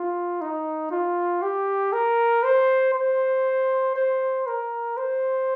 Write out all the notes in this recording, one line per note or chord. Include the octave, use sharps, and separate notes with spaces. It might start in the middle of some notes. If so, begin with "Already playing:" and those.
Already playing: F4
D#4
F4
G4
A#4
C5
C5
C5
A#4
C5